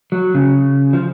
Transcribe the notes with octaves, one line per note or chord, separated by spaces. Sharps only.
F#3
C#3
F3